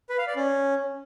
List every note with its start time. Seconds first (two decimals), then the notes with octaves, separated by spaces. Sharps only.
0.10 B4
0.18 F5
0.27 D5
0.36 C#4